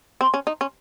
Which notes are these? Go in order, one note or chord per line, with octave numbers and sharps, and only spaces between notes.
C4
C#4
D#4
C#4